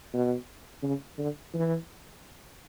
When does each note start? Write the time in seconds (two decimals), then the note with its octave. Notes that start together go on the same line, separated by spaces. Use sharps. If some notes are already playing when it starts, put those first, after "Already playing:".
0.13 B2
0.83 C#3
1.18 D3
1.54 E3